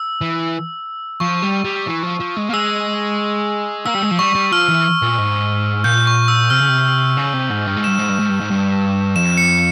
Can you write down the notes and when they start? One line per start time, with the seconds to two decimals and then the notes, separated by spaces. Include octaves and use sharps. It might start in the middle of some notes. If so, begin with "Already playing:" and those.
Already playing: E6
0.21 E3
1.20 F3 C#6
1.43 G3
1.64 G3
1.87 E3
2.03 F3
2.20 F3
2.37 G#3
2.49 A#3
2.53 G#3 E6
3.85 A#3 E6
3.94 G3
4.02 G#3
4.11 F3
4.19 G3 C#6
4.35 G3
4.52 F3 F6
4.68 E3
5.02 A#2
5.18 G#2
5.84 A#2 G6
6.07 C#6
6.28 E6
6.50 C3 F6
6.60 C#3
6.69 C3
7.17 C#3
7.34 C3
7.50 G#2
7.67 G2
7.77 G#2
7.84 G2 E7
7.99 G#2
8.09 G2
8.20 G#2
8.30 G2
8.41 G#2
8.51 G2
9.16 F2 E7
9.37 C#7